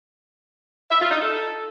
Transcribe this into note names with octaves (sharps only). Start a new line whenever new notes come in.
E5
F4
D#4
A4